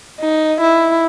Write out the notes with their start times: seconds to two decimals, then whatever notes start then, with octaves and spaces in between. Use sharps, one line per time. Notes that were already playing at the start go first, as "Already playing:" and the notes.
0.20 D#4
0.60 E4